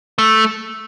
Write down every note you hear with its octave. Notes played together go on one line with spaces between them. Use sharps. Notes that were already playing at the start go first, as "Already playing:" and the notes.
A3